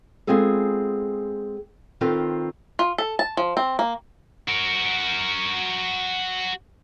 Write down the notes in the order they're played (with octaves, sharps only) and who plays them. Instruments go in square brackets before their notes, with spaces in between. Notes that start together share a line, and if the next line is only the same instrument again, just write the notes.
[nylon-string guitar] G#3 B3 C4 F4 G#4 A4
D#3 C4 F4 A4 B4
[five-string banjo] F4
A4
A5
F3
C4
A#3
[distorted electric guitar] F#4 A#4